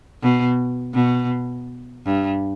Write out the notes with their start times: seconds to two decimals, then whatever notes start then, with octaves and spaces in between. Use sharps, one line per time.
0.22 B2
0.94 B2
2.05 G2